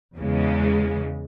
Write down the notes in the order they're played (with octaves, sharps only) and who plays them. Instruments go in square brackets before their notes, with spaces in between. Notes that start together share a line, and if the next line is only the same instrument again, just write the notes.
[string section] E2 C#3 G#3